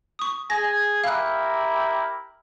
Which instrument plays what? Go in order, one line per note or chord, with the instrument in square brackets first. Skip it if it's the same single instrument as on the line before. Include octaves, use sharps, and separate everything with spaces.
[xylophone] C#6 D#6
[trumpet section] G#4 G#5 [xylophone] A#6
[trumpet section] E4 G4 A#4 [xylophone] F5 F#6